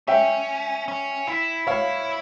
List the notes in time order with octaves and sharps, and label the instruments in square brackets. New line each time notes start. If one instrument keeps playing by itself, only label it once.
[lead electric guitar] C#4 [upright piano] E5 G5
[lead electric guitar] C#4
E4
[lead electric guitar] E4 [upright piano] C#5 F5